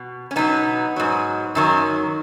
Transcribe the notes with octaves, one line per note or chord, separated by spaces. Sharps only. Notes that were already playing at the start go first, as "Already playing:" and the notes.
Already playing: B2
C#4
B2 F#3 B3 D#4
G#2 F#3
F#2 D#3 F#3